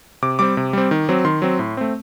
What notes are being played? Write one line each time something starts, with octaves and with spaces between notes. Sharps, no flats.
C3 D6
G3 C4 D6
C3
G3 C4
D#3
F#3 C4
D#3 C6
F#3 C4
A2
A3 C4